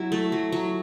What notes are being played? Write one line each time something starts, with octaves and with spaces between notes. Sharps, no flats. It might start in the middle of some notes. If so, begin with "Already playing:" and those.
Already playing: F#3 E4
A3
F#3
F#3